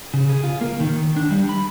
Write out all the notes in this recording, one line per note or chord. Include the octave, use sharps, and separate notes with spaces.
C#3
G#4
F4
A#3
D#3
D4
G3
B5